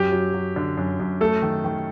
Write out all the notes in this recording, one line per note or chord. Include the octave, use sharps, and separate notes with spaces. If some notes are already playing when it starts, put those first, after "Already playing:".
Already playing: F#2 G4
F#3
F#3
D3
F#2
F#2
A3 A4
D#3
D#3